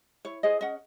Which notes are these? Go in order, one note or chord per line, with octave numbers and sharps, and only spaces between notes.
E4 C#5
G#4 C5 D#5
C#4 D#5 F#5